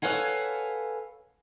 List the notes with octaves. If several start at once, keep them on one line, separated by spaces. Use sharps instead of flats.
A4 B4 C#5 F5 F#5 G#5